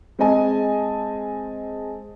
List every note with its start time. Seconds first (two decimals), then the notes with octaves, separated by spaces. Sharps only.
0.19 G#3 C4 G#4 D#5 G#5 A5